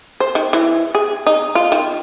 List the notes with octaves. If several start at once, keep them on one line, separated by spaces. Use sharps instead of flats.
C5
D#3
E3
G#4
D#4
F4
D#3